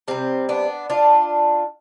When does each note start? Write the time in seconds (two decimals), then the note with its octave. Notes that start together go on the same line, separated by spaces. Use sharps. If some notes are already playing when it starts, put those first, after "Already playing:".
0.08 C3 G3 C4
0.49 B3 D4
0.90 D4 F4